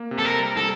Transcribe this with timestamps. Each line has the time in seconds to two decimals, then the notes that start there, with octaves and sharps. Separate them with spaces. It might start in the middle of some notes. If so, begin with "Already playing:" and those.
Already playing: A#3
0.11 C3
0.19 A4
0.25 A#4
0.39 G3
0.57 A4